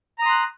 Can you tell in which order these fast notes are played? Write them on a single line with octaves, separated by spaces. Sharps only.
A#5 D#6 C6 F#6